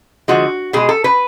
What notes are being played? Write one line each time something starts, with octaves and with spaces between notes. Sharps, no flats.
D3 F3 G#3 F#4
B2 G#3 G#4
A4
B4